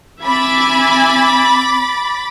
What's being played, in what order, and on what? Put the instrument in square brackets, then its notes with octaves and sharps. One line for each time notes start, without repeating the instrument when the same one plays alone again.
[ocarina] C4 [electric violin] E5 G#5 [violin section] B5 D6 A6